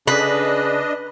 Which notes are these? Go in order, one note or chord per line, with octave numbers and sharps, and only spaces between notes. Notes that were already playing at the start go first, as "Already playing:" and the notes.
C#3 D4 B4 D#5